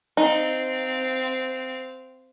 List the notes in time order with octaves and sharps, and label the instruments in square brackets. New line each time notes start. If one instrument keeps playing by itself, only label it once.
[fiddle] C4 F5 [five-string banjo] D#4